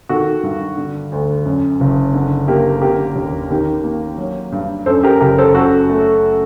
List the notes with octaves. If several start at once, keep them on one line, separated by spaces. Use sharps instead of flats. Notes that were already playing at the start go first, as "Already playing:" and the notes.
D#3 F#4 A4
G2
D3
D2
F#2
F#1
D3
A#3 G4 A#4
D3 G4 A#4
D#2
D#3 G4 A#4
A#3
F#3
G2
F#2 A4 C5
G4 A#4
F#1 G4 A#4
A4 C5
F#2 F#4 A4
A3